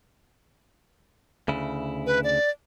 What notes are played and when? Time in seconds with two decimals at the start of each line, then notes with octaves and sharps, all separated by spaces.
1.48 D2 C#3 E4
2.06 B4
2.24 D5